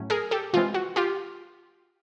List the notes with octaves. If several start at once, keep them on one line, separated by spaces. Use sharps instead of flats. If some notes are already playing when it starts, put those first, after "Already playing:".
Already playing: A2 F#3 A3 C#4
G#4 A#4
G4 A4
C3 E3 G#3 C4 F4
F#4
F4 G4